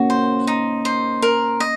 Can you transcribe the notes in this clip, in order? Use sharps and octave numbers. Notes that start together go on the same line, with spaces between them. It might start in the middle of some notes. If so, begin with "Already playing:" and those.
Already playing: A#3 C#4 F#4
C5
D#4
C5
A#4
D#5